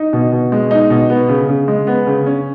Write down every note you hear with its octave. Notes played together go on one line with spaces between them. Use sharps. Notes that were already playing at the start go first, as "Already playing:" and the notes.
Already playing: D#4
B2
B2
G#3
D#4
B2
B3
C#3
C#3
G#3
B3
C#3
C#4